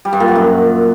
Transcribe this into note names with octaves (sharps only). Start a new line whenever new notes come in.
G3
G2
A#2
F#3
F#2